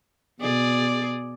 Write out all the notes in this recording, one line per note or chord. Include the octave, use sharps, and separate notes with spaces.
B2 G#4 D5